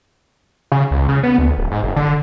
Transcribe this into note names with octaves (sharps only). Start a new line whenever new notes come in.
C#3
C#2
C#3
B3
D2
D1
G#2
F#1
D3